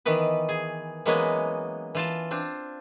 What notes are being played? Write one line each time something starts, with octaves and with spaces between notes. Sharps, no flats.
D#3 E3 B3 B4
G#4
E3 F#3 G#3 A#3 B3 C#4
E3 F4 A5
C4 D4 F4